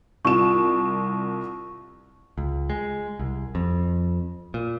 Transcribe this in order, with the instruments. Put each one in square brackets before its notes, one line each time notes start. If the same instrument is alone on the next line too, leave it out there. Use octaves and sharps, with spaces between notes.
[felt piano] C2 F4 E7 [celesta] C#6
[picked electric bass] C#2
G#3
C2
F2
A#2